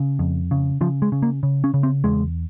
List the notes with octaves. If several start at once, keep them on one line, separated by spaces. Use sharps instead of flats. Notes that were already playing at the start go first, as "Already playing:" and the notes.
Already playing: C#3
F2
C#3
C#3 F3
G#3
C#3
A#3
C#3
C#4
C#3
C4
E2 G#3